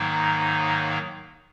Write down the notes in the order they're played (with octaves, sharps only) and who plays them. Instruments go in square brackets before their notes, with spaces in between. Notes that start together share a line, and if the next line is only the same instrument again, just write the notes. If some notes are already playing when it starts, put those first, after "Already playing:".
Already playing: [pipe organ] G#2 D#3 F#3 A#3 D#4